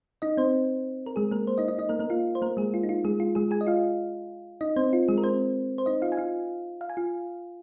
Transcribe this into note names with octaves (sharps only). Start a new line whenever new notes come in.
D#4 D#5
C4 C5
A#4
G#3 G#4
A#3 A#4
C5
D#4 D#5
D#4 D#5
D#4 D#5
A#3 A#4
A#3 A#4
F4 F5
C5
A#3 A#4
G#3 G#4
F4
D#4
F4
G#3 G#4
F4
G#3 G#4
G#4 G#5
D#5
F4 F5
D#4 D#5
C4 C5
F4
G#3 G#4
A#4
C4 C5
C5
D#4 D#5
F4 F5
G#5
F4 F5
F5
G#5
F4 F5